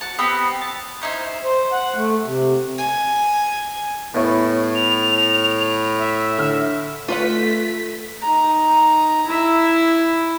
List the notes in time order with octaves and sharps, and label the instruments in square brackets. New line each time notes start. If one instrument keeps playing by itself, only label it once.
[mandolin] F#4 A5
B3 C4 G4 B5
A5
C#4 D#4 E4 C5
[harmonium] C5
F#5
A3
C3
[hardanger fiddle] G#5
[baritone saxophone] A2 [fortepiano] B3 E4 C#5
[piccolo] F7
E5
[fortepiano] D3 F6
[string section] A3 B6 [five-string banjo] F4 B4 F#5
[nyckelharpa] D#4 A#5
E4 E5